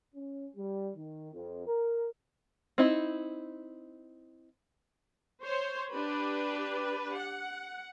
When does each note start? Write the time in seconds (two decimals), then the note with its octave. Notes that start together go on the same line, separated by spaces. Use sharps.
0.15 C#4
0.56 G3
0.96 D#3
1.32 F2
1.67 A#4
2.78 C4 D#4 E4
5.44 C5 C#5
5.93 D4 G4 B4
7.15 F#5